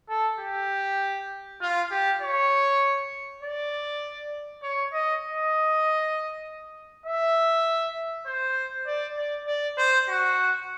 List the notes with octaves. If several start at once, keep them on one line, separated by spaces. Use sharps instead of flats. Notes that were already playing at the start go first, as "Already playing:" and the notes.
A4
G4
F4
G4
C#5
D5
C#5
D#5
D#5
E5
C5
D5
D5
D5
C5
F#4